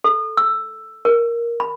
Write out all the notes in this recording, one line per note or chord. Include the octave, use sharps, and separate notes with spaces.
A4
E6
A#4
B5